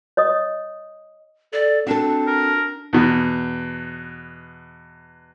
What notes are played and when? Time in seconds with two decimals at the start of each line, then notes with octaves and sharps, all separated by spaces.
0.17 C#5 D#5 D#6
1.53 A4 D5
1.87 C4 D4 F#4 A4
2.27 A#4
2.93 E2 B2